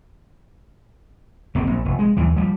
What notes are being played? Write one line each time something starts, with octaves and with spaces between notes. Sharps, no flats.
F#1 A#3 C4
A#1
F1
G#3
D#2 E3
F3 G3